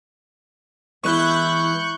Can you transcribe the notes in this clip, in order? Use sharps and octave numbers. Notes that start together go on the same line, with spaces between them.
E3 G#3 B3 E4 C#6 F#6 G6